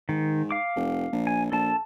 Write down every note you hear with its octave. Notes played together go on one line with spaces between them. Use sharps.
G#2 D#3
F5 D6
F1
A#1
G#5
A#1 A4 A5